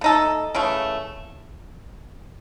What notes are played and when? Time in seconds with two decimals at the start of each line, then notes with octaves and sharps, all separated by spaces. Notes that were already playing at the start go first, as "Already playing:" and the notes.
0.01 A3 D#4 A4
0.54 C#3 E3 A3